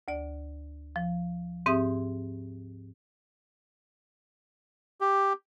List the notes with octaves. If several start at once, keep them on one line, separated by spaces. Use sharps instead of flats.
D2 D5
F3
G#2 C4 G4 E5 C6 D#6
G4